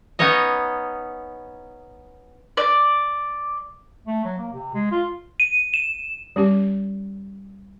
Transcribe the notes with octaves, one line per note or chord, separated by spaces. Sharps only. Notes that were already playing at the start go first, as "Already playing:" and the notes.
B3 C#4 D#4 C#5 D#5
D5
A3
F#3
A#3
C3
G#3
F4
D#7
E7
G3 C#4 G4